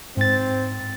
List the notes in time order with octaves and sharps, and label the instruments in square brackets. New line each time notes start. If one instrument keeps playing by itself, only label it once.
[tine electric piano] G#2 A6 [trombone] C4